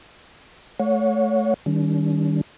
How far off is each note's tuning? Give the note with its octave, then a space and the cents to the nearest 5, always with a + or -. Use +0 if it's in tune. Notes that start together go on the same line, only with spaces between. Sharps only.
A3 -20 C#5 +15 F#5 -35
D#3 +0 G3 -5 C#4 +45